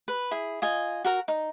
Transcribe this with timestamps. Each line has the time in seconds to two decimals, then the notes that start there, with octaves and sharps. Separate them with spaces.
0.08 B4
0.31 E4 G#4
0.62 F4 D#5 G#5
1.05 F#4 A#4 A#5
1.28 D#4